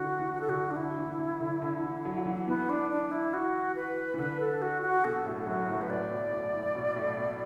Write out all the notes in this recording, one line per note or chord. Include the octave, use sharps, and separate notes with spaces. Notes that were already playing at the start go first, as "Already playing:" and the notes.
Already playing: D3 E3 F#4
E3
F#4
A4
D3 F#4
D4
D3 E4
E3
D3
E3
D3
D3
E3
F#3
F#3
E3
E3 B3
D4
D4
E4
F#4
B4
E3
D3 B4
A4
F#4
F#4
B2 A4
A2
A4
F#2 F#4
A2
B4
A2 D5
B2
A2
A2
B2
A2
B2